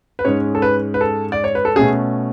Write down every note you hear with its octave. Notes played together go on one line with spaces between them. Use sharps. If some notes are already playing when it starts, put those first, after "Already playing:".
B4
G#2 G#3 C#4 C#5
A4
B4
B4
A4
D5
C#5
B4
A4
B2 A3 C#4 G#4